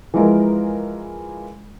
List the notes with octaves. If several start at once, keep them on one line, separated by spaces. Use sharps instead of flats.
E3 F3 G#3 A#4